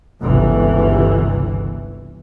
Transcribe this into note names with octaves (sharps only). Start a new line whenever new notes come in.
G1 C#2 C3 E3